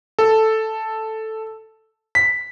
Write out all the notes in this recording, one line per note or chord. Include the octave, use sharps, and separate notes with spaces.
A4
B6